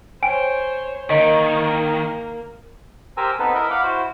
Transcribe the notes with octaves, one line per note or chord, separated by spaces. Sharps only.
C5 C#5 G5 G#5 D7
D3 D#3 A#3 D#5
G4 A#4 C5 G#5 A#5 E6
B3 C4 D#4 A4 B4
E4 A#4 D#5 E5 B5
F5 F#5 B5 D6
E4 F#4 C5